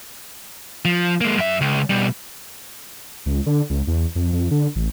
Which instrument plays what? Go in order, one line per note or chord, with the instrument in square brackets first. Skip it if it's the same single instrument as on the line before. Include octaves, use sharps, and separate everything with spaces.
[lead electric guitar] F3
G#3 A#3
F#2 E5
C#2
B2 G3
[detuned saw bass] C#2
D3
C#2
E2
F2
F2
D3
A1